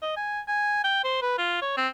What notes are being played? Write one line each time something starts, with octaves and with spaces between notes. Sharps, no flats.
D#5
G#5
G#5
G5
C5
B4
F4
C#5
C4